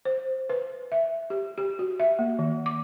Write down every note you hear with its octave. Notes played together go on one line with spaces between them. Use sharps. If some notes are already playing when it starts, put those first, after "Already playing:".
C5
B4
E5
G4
G4
F#4
E5
A#3
D#3
D6